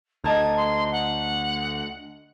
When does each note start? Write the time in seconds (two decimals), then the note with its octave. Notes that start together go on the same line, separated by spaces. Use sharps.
0.24 D2 D#5 A5 A#5 G#6
0.57 C6
0.92 F#5